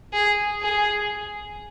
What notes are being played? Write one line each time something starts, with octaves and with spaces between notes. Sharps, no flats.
G#4
G#4